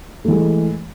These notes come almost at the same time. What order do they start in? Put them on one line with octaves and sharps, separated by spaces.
A3 E3 G#3